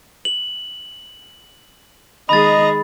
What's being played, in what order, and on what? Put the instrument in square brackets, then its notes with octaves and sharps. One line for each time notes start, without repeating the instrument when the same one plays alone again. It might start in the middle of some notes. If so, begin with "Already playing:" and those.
[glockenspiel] F#7
[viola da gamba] D#3 G#3 G#4 [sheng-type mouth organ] D#5 A#5 [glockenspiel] B5 A6